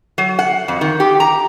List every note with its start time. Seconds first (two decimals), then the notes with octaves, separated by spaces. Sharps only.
0.18 F#3
0.39 F#5
0.68 F2
0.81 D#3
1.00 G4
1.20 A#5